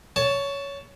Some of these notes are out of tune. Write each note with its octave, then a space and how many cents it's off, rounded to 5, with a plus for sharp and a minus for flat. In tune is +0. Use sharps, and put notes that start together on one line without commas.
C#5 +15 A5 +0